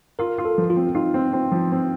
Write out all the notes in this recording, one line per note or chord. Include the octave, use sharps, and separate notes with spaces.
F4 A#4
F4
A4
F3
F4
C4
D#4 F4
C4
C4
F3
C4